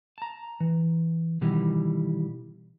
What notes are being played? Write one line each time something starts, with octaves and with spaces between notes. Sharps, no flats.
A5 A#5
E3
B2 D#3 E3 G3